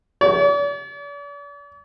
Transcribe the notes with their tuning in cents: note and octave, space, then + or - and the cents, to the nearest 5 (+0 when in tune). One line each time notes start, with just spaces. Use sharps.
D5 -45